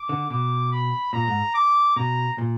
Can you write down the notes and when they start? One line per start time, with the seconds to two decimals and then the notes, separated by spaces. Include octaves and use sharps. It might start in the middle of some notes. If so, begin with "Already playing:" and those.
Already playing: D6
0.09 D3
0.30 B2 D6
0.72 B5
1.13 A#2 A#5
1.27 G#2
1.55 D6
1.96 B2 A#5
2.38 A#2